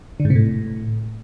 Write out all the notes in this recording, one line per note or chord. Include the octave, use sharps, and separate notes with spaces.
D3
G#2
C3
A2